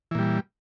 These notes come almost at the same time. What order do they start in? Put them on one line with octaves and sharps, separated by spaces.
E3 A#2 G3